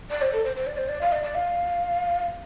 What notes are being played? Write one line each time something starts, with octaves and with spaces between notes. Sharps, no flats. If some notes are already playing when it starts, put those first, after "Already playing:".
D5
C5
A4
C5
C5
D5
C5
D5
F5
D5
D5
F5